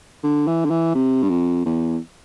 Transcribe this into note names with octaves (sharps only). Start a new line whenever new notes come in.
D3
E3
D3
E3
C3
G2
F2
E2